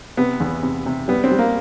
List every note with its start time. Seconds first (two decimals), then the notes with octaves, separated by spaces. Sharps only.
0.17 C3 B3
0.40 E2
0.63 C3
0.86 C3
1.08 G3 B3
1.24 C4
1.31 G3
1.39 A#3